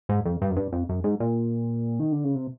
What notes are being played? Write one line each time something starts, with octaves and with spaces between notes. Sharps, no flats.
G#2
F2
G2
F#2
G2
F2
F#2
G#2
A#2
D#3
D3
C#3
C3